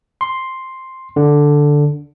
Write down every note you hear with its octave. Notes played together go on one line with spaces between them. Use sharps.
C6
D3